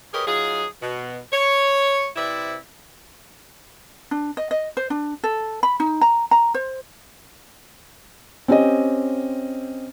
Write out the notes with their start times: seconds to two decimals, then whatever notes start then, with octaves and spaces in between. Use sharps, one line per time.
0.13 G4 G#4 A#4 B4 C#5 D#5
0.27 F#3 D#4 F4 G#4
0.82 B2
1.33 C#5
2.16 C3 C4 E4 B4 D5 E5
4.11 D4
4.37 D#5
4.51 D#5
4.77 C5
4.90 D4
5.24 A4
5.63 B5
5.80 D#4
6.01 A#5
6.31 A#5
6.54 C5
8.48 C4 C#4 G4 D#5